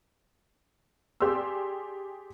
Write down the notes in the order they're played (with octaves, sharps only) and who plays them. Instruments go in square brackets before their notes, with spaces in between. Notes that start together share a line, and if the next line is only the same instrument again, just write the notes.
[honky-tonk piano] G4 G#4 D5 C6 E6